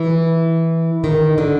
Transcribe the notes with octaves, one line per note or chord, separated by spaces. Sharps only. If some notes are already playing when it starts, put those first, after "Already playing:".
Already playing: E3
D#3
D3